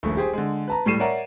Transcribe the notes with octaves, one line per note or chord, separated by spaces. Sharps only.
D#1 A#1 A3
G4 G#4 C5
D3 G#3
B4 A5 A#5
A2 G3 A3 C7 D#7 E7
A#4 C#5 D5 E5 F#5 A#5